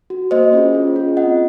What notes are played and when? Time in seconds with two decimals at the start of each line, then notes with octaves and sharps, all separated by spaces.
0.10 F#4
0.31 A#3 C5 D#5
0.53 C#4 F4 G#4
0.75 C#4
0.96 F4 G#4
1.17 C4 D#5 F#5